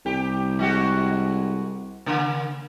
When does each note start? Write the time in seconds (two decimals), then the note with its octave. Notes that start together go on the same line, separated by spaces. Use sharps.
0.06 C2 G4
0.59 G#3 F#4 G4
2.06 C#3 A#3